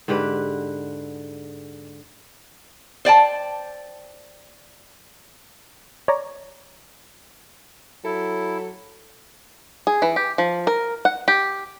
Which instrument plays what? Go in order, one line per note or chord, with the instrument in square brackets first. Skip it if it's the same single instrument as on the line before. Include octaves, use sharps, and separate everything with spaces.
[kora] G#2 D3 G4 B4
[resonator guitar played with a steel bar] C5 D5 G5 A5
[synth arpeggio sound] C#5 D5 A#5
[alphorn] F#3 [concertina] E4 [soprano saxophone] A4
[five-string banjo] G#4
E3
G4
F3
A#4
F#5
G4